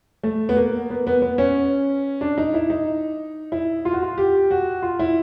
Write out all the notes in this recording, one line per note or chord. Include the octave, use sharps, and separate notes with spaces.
A3
B3
A#3
B3
B3
B3
C#4
D4
D#4
E4
D#4
E4
F4
F#4
F4
G4
F#4
F4
E4